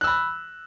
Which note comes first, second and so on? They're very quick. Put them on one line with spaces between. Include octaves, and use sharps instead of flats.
F#6 E6 B5